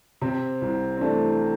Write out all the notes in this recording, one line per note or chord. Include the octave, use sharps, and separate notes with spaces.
C3 C4
C2
C4
E3 A3 D4